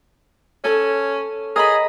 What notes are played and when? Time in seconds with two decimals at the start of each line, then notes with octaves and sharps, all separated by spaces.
0.64 C#4 A4 C#5
1.56 G#4 A#4 D#5 B5